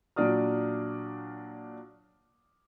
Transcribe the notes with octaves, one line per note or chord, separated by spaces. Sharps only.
A#2 F#3 D4 D5 D#6 F6